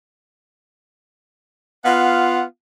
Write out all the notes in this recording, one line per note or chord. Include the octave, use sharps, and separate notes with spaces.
B3 F4 F5 F#5